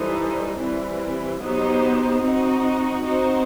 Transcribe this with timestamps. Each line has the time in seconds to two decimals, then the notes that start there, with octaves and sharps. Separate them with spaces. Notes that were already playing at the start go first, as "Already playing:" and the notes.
Already playing: E3 G3 D#4 A4 C5
0.59 E3 G3 C4
1.41 F#3 B3 D#4 G4 C5
2.22 C4 D#4 F#4
3.03 C4 D#4 F#4 C5